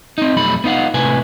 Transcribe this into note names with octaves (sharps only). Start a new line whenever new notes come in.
C4 D#4
B1 F2 G3 A3 B5
B3 D#4 F5 F#5
C2 A2 C3 B4 G#5